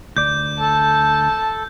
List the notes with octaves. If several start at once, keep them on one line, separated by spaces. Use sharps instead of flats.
D2 D5 G6
A4 A5